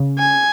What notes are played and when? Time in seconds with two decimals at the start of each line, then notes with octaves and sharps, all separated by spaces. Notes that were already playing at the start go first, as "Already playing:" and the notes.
Already playing: C#3
0.19 G#5